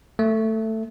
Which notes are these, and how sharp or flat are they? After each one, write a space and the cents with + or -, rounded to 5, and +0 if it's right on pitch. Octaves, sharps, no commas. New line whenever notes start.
A3 +10